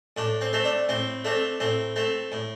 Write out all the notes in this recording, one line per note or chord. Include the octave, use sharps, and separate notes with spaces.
A2 D4
C4
A3 C4
D4
A2 C4
A3 C4 D4
A2 C4
A3 C4
A2